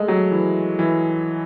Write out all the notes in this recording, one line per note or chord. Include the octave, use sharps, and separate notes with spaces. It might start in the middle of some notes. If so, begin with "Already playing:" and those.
Already playing: G#3 A3
F#3
E3
E3